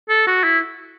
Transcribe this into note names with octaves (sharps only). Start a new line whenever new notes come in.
A4
F#4
E4